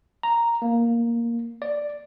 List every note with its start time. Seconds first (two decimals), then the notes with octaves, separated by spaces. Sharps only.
0.23 A#5
0.62 A#3
1.62 D5